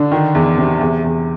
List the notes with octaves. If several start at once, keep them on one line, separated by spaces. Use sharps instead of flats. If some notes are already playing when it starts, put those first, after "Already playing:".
Already playing: D3 D4
D#3
E2
C3
E2
E2